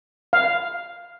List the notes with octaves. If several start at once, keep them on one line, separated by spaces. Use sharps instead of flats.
F5